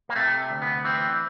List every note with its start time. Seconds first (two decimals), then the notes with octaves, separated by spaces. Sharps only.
0.09 A#3
0.16 C3 A3
0.50 D2
0.62 B3
0.84 E3 C4